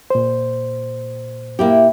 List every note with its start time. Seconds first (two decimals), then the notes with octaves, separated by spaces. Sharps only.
0.10 A#2 C5
1.59 A#3 E4 G4